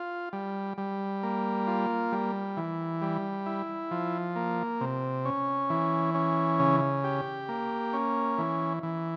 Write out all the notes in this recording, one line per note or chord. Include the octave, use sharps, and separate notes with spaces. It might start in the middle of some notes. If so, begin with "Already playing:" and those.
Already playing: F4
G3
G3
A#3
F4
G3
E3
G3
E4
F3
A#3
C3
C#4
E3
C#4
C#3
G4
A#3
C#4
E3
E3